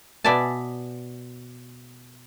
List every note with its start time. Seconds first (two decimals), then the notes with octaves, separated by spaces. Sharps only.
0.24 B2 B3 D5 E5 G#5 A5